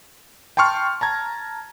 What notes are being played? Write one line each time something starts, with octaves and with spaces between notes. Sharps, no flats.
G5 A5 C6 C#6 F6
A5 A#5 G#6